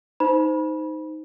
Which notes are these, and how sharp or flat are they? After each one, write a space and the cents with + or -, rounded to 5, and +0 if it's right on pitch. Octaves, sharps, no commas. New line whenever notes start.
D#4 +10 C5 -15 B5 -25